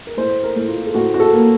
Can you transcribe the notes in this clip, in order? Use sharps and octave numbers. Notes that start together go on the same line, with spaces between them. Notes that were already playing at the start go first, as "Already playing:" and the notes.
A#4
A2 C5
A#4
A2
F4
A4
A2 F#4
F#4
A4
A#3